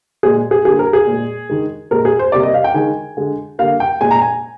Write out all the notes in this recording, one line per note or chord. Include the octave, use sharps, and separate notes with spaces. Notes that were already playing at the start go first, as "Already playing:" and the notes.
A#2 G#3 G#4
G#4
D3 G3 A#3 G#4
A#4
G#4
A#2 G#3
D#3 G#3
A#2 G#3 A#4
G#4
C5
C3 G3 A#3 D5
D#5
F5
G5
D#3 G#3 G#5
D3 G#3
D3 G3 A#3 F5
G5
A#2 G#3 G#5
A#5
G#5